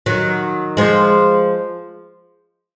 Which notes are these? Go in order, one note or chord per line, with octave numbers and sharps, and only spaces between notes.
D#3 F#3
F3 G#3